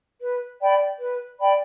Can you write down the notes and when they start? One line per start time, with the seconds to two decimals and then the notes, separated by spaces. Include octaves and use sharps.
0.21 B4
0.60 D5 G5 B5
1.00 B4
1.39 D5 G5 B5